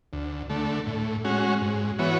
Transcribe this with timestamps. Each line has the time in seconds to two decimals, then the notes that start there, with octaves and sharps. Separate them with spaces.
0.13 D2
0.50 D3 A3
0.87 A2
1.25 G#3 C#4 F#4
1.62 G#2
1.99 E3 B3 F#4 C#5